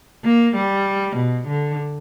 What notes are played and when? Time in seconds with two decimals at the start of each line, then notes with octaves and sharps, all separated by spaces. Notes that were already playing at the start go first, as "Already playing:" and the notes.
0.24 A#3
0.55 G3
1.16 B2
1.48 D3